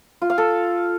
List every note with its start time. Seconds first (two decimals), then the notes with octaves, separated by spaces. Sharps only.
0.22 F4
0.30 F5
0.38 A4